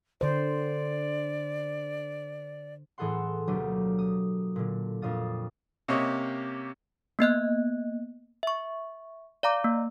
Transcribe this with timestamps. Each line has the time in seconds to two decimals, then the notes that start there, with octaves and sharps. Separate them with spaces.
0.21 D3 C5 D5
2.98 A2 E3 G#4 A4 F#5 C6
3.47 D2 B2 F#3 A#3 G4 D#7
3.99 D#6
4.56 A#2 D3
5.02 F2 A#2 D4 F5 D#6 A6
5.88 C3 A#3 C#4 G4 C#5 D#5
7.19 A#3 B3 D#5 F#6
8.43 E5 C#6
9.43 D5 F5 A#5 D6
9.64 A#3